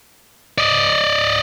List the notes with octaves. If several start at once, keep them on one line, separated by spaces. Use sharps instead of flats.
D5 D#5